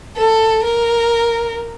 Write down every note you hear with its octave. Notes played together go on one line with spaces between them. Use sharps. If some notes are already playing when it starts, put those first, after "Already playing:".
A4
A#4